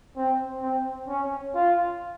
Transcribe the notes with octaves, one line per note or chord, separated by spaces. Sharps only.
C4
C4
C#4
F4